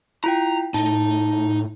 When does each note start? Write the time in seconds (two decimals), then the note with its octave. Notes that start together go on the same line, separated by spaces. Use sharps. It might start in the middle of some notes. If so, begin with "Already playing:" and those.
0.24 E4 F4 G5 A#5
0.74 A2 D#4 A5